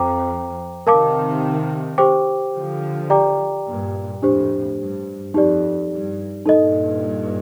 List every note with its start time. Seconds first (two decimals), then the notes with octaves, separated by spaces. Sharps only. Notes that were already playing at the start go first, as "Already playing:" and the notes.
Already playing: F2 C5 G5 A#5 D6
0.87 C3 D#3 A#4 F5 A5 D6
1.98 G4 C5 G5 D6
2.54 D3 F3
3.10 G4 D5 G5 A#5 D6
3.66 G2 A#2
4.22 F2 A2 D4 G4 C5
4.78 G2
5.34 F2 D#4 G4 D5
5.90 G2
6.46 G2 A#2 D#4 A4 D#5